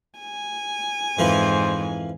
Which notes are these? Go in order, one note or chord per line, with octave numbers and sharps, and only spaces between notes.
G#5
F2 G#2 E3 F3 C5